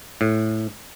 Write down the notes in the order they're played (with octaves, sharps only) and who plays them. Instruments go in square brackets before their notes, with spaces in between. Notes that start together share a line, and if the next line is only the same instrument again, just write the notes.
[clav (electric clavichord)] A2